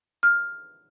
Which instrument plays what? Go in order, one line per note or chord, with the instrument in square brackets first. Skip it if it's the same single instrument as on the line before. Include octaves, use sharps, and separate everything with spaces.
[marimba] F6